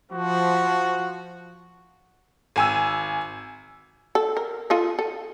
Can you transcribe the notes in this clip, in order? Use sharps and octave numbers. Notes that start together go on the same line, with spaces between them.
F3 F#4
G#1 G#5 E6
A4
A#4
F4 A4 D#5
A4